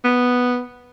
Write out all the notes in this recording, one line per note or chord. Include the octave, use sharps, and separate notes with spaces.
B3